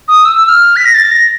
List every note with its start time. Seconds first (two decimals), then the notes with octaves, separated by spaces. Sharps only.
0.08 D#6
0.25 E6
0.37 E6
0.49 F6
0.76 B6
0.86 A#6
0.94 A6
1.11 A#6